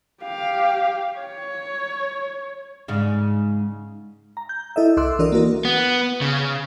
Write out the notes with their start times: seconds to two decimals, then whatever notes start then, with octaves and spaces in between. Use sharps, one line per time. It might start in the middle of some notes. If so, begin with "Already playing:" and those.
0.23 G4 F5
1.18 C#5
2.88 G#2 C#3
4.37 A#5
4.49 G6
4.76 E4 A4 D#5 E5
4.97 C2 A4 C6 D6 E6 F#6
5.19 E3 D4 F#4 A#4 D5 D#5
5.32 A#3 E4 F#4 A#4
5.65 B3
6.21 C#3